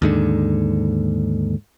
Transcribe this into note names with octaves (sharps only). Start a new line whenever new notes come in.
D#2 G#2 D3